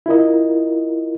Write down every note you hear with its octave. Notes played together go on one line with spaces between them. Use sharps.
E4 F4 A#4 D#5